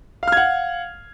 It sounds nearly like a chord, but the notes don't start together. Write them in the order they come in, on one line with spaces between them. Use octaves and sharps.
F5 F6 G#6 F#5